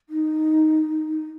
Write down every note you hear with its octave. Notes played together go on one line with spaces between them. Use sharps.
D#4